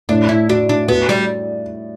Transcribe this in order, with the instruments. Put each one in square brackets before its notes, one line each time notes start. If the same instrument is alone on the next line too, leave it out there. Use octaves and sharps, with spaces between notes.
[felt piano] A2 [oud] D4
[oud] E4
[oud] D4 [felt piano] F#4
[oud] D4
[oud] B3 [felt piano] F#4
[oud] G3